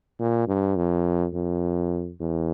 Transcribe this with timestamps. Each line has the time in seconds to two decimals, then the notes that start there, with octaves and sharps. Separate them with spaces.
0.19 A#2
0.48 G2
0.76 F2
1.34 F2
2.20 E2